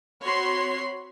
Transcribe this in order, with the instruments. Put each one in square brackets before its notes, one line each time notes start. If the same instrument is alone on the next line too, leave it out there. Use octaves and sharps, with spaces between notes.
[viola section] C4 F#4 C#5 B5 C6